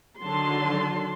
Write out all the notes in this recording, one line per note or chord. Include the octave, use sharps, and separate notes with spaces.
D3 D#3 F#3 A5 C6